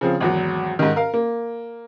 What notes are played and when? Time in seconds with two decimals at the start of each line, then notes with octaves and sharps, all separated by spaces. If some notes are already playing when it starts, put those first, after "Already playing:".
0.01 C#3 F3 C4
0.20 G#1 E2 F#3
0.79 G#2 D#3
0.96 A#4 F5
1.14 A#3